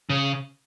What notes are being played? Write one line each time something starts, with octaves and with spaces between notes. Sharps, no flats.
C#3